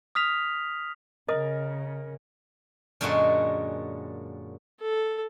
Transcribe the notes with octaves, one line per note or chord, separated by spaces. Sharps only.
D#6 F6 B6 F7
C#3 A#4 D#5 D#6
F#2 A#2 D3 G#3 F#4
A4